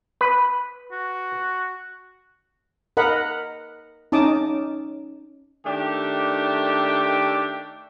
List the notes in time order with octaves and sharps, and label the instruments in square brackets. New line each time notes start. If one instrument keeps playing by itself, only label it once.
[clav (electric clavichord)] B4
[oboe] F#4
[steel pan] A#4 D#5 F#5 B5
C#4 D#4 A5 D6 D#6
[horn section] D#3 A3 D4 G4